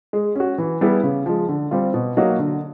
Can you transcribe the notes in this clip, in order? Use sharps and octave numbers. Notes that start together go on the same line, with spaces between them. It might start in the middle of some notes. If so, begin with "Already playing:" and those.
G#3
C#4 F#4
E3
G3 B3 E4 G#4
C#3
F3 G#3
D3
G3 C4 F4
B2
F#3 A#3 D#4 F#4
D3